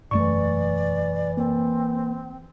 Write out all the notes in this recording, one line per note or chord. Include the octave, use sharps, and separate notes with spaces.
E1 F#2 E3 A3 D5 C#6
A#3 C4